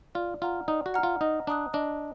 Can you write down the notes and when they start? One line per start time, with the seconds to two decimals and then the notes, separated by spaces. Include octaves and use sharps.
0.15 F4 D5
0.42 F4 F#5 A#5 F6
0.68 D#4 D5
0.86 F#4
0.94 F#5 A#5 F6
1.03 F4
1.21 D#4 D#5
1.47 D4 A#5 D#6 F#6
1.74 D4 D#5